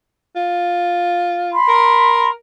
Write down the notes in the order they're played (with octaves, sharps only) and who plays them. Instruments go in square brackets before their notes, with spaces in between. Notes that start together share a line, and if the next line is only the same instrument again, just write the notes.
[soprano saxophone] F4
[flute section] B5 C6
[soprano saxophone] A#4